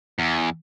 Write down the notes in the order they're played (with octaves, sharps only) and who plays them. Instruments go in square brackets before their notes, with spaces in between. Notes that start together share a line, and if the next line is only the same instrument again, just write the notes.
[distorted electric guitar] E2